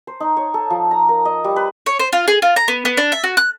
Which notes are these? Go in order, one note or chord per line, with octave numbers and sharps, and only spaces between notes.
C5
D#4
C#5
A4
F3
A#5
A#4
D#5
G3
B4
C#5
C5
F4
G#4
F4
A#5
B3
B3
D4
E5
F#4
F#6